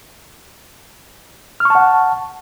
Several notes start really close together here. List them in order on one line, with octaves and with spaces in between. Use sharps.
F6 C#6 A5 F#5